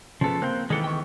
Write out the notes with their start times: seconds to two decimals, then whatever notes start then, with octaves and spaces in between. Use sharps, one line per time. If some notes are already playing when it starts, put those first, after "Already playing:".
0.21 C#3 F3 B3 A4
0.42 A#3 C4 F#6 G6
0.70 D#3 E3 G#3 B3 A4
0.84 G5 C#6